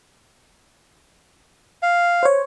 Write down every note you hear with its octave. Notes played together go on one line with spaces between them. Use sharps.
F5
C5 C#5